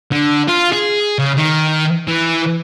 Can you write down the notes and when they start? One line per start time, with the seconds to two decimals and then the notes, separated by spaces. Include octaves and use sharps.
0.12 D3
0.49 F4
0.73 G#4
1.19 C#3
1.37 D#3
2.08 E3